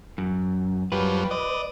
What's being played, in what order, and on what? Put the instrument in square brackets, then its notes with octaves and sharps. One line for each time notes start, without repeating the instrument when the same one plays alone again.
[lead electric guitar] F#2
[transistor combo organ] F#2 F3 G3 [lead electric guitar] B4
[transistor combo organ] D5 D#5